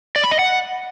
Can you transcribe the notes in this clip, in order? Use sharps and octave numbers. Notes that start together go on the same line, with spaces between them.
D5
B5
D#5
F#5